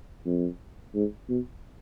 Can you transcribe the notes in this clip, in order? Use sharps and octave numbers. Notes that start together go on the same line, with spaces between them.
F2
G#2
B2